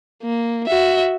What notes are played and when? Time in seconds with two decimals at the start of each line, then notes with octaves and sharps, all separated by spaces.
0.23 A#3
0.67 F#4 E5